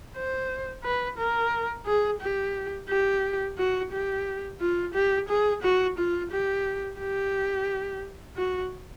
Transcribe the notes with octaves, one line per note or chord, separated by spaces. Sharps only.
C5
B4
A#4
G#4
G4
G4
F#4
G4
F4
G4
G#4
F#4
F4
G4
G4
F#4